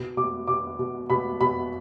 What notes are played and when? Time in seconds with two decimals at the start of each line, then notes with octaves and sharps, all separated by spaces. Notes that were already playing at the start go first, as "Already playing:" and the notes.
Already playing: B2
0.17 B2 D6
0.48 B2 D6
0.79 B2
1.10 B2 B5
1.41 B2 B5